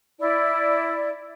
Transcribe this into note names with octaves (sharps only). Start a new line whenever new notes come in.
E4 D5